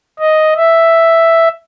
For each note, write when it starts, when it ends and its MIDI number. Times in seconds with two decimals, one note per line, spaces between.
0.19 0.53 75
0.56 1.48 76